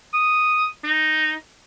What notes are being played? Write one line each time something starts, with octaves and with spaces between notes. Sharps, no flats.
D#6
D#4